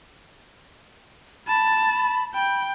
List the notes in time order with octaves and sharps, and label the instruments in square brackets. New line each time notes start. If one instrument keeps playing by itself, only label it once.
[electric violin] A5 [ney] B5
[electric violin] G5 [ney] B5